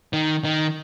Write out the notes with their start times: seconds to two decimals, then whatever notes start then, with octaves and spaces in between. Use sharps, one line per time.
0.13 D#3
0.44 D#3